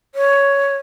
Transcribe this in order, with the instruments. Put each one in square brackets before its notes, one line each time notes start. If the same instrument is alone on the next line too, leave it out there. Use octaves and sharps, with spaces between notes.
[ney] C#5